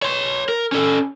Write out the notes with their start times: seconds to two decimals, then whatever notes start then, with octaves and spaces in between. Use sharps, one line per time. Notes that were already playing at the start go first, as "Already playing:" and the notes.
0.02 C#5 C6
0.49 A#4
0.72 C#4 A4